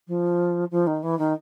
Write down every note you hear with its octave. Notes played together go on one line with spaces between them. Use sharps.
F3
F3
D#3
E3
D#3